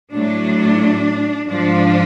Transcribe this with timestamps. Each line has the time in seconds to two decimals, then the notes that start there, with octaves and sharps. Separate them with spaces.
0.11 A2 F#3 D4
1.46 G#2 F3 D4